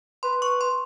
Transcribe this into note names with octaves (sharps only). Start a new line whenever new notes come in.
B4 C6
C#6
C6